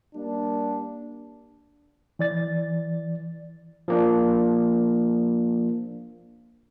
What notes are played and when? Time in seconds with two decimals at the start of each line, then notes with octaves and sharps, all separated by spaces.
0.14 G3 A#3 D4
2.19 E3 D5 A6
3.88 F3 A#3 D4